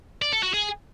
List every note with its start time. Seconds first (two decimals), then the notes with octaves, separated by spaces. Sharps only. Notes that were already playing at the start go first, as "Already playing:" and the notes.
0.22 D5
0.32 A4
0.43 F#4
0.54 G#4